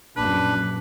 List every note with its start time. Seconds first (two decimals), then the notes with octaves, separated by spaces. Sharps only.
0.17 A#1 F#2 D4 B4